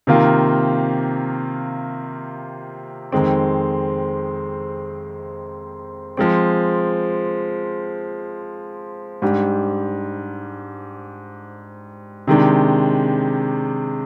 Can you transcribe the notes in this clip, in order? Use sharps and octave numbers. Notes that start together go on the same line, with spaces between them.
C3 D#3 A#3 F4
F2 D#3 G#3 C4
F3 G#3 C4
G#2 G3 D4 G4
C3 D#3 G#3 D4